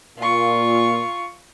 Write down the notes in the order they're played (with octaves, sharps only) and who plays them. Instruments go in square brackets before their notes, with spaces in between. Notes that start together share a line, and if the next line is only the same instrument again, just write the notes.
[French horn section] A#2 [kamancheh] F4 C#6